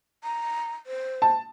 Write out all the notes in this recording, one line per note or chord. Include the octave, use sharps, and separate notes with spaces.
A#5
C5
A5